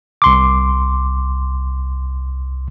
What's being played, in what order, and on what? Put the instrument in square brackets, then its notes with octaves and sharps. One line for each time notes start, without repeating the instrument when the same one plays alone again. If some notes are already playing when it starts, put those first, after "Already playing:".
[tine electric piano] C2 C6 D6